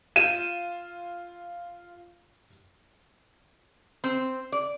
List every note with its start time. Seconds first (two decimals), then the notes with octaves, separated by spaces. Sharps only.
0.16 F4 D#7 E7
4.04 C4
4.52 D5